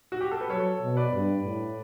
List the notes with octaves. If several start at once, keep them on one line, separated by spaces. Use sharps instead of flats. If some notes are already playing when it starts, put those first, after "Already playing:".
F#4
G4
A4
B4
F#3 A4 C#5
B2
B4 D5
G2
A2